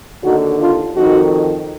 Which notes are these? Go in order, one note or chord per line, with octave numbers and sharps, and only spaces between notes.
D#2 D3 D#4 F#4
D4 F4
F2 D#3 D#4 F#4